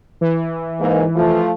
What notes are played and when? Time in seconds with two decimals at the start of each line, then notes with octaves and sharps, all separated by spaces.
0.21 E3
0.80 G#2 A#3
1.16 F3 A3 F4